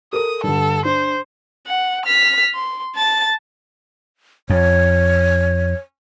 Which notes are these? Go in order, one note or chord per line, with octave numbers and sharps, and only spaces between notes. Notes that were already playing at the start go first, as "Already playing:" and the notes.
A4 A#4 D#6
G2 D3 A4
D4 C5
F#5
F6 B6
C6
A5 A6
F2 C#5